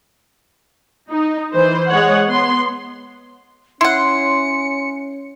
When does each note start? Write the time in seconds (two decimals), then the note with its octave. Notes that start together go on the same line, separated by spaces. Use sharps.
1.11 D#4
1.54 E3 C5
1.89 G#3 C#5 F#5
2.28 B3 C6
3.81 C#4 E4 F#5 C6 C#7